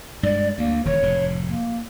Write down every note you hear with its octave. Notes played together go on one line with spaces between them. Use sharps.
G2 G#3 D5
D2 A#3
E1 D#3 C#5
F1 A2
A#3